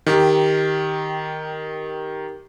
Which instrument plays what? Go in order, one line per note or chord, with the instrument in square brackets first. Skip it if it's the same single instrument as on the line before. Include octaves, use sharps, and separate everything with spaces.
[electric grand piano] D#3 G4